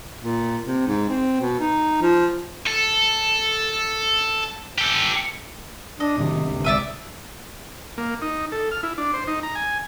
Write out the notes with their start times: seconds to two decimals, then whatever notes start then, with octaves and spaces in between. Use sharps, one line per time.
0.21 A#2
0.65 C3
0.87 G#2
1.09 C4
1.41 B2
1.60 D#4
2.01 F3
2.66 A4
4.78 G4 A4
6.00 D4 D#5
6.18 A2 C3 D#3 F#3
6.47 G1 C#2 D3
6.64 G#1 C#2 G#3 D5 E5 D#6
7.98 A#3
8.22 D#4
8.52 A4
8.71 F6
8.83 E4
8.98 D4
9.14 C5
9.28 D#4
9.43 A#5
9.55 G#5